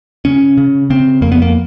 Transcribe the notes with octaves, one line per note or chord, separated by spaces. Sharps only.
C#3 C#4
C#3
C#3 C4
F2 A#3
B3
A#3